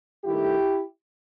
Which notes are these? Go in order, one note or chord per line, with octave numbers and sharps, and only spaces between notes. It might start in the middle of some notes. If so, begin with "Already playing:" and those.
G2 D#3 A3 E4 G4